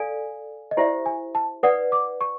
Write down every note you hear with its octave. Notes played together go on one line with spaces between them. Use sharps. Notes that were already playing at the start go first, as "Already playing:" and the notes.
Already playing: A4 D5 F5 G#5
D#5
E4 G4 C5 D5 E5
G#5
A5
B4 D5 F#5 D#6
D6
C#6